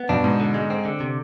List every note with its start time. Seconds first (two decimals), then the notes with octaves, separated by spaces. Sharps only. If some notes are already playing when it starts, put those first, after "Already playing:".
Already playing: B3
0.09 G2 B2 D4
0.24 G#2 B2
0.40 D3
0.54 G#3
0.70 C4
0.85 D3
1.00 C3